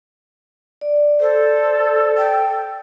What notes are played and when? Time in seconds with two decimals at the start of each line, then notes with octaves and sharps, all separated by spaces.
0.81 D5
1.20 A4 C5
2.17 G5